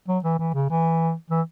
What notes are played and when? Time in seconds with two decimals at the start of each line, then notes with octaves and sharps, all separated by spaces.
0.08 F#3
0.24 E3
0.39 E3
0.54 C#3
0.70 E3
1.30 E3